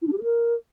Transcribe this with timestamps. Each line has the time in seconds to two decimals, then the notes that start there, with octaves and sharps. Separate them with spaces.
0.02 E4
0.07 D4
0.12 G4
0.18 G#4
0.23 A#4